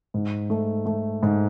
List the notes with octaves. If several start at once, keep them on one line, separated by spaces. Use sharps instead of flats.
G#2
A3
A3
G#2